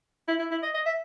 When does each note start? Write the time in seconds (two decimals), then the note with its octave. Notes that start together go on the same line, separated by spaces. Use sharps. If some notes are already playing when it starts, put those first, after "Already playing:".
0.28 E4
0.39 E4
0.51 E4
0.63 D#5
0.74 D#5
0.86 E5